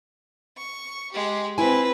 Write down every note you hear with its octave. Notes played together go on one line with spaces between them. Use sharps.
C#6
G#3 G4
C4 E4 B4 G#5